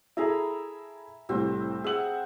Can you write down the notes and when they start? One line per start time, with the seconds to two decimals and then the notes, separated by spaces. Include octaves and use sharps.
0.17 E4 G#4 A4 E5 A#5 B5
1.29 C2 A2 C4
1.84 G#4 E5 F#5 F#7